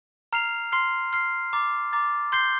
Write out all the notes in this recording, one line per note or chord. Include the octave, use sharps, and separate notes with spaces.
A#5 F6 C7 F7
C6 F6 C7
C6 F6 C7
A#5 D6 A6
A#5 D6 A6
C6 G6 C7 G7